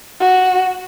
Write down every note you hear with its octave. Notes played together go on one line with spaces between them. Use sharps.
F#4